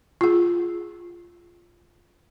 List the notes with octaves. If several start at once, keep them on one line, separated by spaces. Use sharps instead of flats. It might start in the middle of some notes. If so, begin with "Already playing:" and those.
F4 G#4